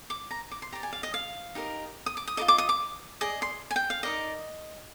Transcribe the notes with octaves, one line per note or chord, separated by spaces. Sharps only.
D6
A#5
D6
C6
G4 D5 A#5
G#5
F5
D#5
F5
D#4 G4 A#4 D#5
D#6
D6
D#6
F4 A#4 D#5 D6
D6
D#6
D6
G#4 D5 D#5
C6
G#5
G5
F5
D#4 A#4 D5 D#5